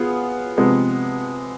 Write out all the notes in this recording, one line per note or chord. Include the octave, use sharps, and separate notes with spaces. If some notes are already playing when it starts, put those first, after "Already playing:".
Already playing: B3 F4 G#4 B4
C3 F3 G#3 B3